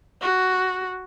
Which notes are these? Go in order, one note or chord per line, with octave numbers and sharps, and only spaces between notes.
F#4